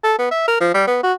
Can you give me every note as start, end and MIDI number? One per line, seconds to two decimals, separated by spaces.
0.04 0.17 69
0.19 0.30 59
0.31 0.47 76
0.47 0.57 70
0.61 0.73 53
0.74 0.87 55
0.87 0.98 59
1.03 1.13 66